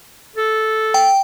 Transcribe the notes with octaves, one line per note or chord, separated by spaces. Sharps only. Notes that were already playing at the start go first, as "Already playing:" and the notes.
A4
G5